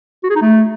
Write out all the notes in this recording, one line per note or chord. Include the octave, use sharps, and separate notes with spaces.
F#4
G#4
D#4
A3